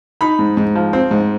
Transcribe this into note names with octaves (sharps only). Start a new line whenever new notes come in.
D#4 B5
G#2
G#2
F3
C4
G#2